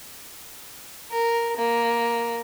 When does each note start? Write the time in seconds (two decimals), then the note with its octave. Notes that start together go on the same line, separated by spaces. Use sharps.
1.11 A#4
1.57 A#3